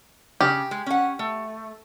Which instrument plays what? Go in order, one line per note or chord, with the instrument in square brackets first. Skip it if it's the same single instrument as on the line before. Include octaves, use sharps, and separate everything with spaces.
[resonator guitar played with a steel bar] C#3 [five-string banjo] G4
[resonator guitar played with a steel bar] G#3
C#4 F#5
A3